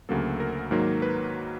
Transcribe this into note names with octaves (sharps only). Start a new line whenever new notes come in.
D2 C#3 F#3 A#3 A4
A#4
G#2 D#3 F#3 A#3
B4